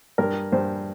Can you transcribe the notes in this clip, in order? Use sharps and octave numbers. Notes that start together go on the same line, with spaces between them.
G2 A#4
G2 C5